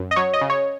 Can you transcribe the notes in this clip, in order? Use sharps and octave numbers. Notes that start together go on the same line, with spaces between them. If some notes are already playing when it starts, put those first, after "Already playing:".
Already playing: F#2
D#5
F#3 C#5
D#5
C#3
C#5